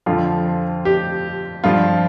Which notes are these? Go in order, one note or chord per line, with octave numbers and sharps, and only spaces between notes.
F2 D3 F3 F4
G4
G2 F3 F4